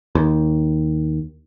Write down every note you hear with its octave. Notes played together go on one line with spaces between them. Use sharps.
D#2